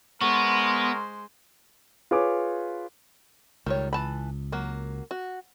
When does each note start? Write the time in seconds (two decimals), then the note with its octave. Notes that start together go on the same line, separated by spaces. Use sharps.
0.21 G#3 B3 A#4 C5 C#6
2.11 F4 G#4 B4 C#5 G#5 D6
3.66 C#2 D#3 G3 C#5
3.93 E3 A5 B5
4.52 F#3 A#3
5.11 F#4